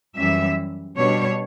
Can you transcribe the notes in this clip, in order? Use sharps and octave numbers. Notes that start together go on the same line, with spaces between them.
F#2 E3 G3 E5
B2 G3 D4 C#5